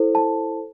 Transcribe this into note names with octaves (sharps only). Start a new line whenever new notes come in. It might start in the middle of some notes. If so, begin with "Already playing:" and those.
Already playing: E4 A4 C5
A5